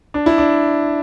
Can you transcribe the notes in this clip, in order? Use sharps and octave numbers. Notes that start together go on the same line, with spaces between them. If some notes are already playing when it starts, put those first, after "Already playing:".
D4
E4
D4